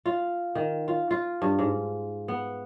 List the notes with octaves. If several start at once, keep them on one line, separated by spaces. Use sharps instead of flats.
F4
D#3
F4
F4
G2
G#2
B3